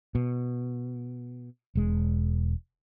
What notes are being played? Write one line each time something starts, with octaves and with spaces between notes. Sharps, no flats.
B2
E1 G#3